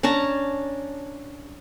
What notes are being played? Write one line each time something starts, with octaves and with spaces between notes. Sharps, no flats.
C#4 D4 A5 A#5